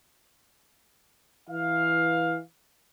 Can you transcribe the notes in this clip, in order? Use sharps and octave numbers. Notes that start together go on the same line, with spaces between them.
E3 F5